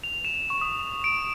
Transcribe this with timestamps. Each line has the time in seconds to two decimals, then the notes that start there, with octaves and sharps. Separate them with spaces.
0.04 F7
0.25 E7
0.50 C#6
0.61 D#6
1.04 D7